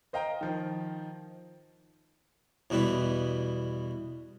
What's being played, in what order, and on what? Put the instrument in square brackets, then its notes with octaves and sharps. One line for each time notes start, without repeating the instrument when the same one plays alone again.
[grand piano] C5 D#5 F5 G5 A#5
D#3 F3
[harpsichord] E2 B2 G3 E4 B4